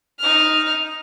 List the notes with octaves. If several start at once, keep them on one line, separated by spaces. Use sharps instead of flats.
D#4 F6